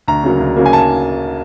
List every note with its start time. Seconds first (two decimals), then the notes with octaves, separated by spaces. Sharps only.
0.08 D2 A#5
0.24 C#3 F#3 A#3
0.40 D2
0.56 C#3 F#3 A#3
0.66 G#5
0.73 A5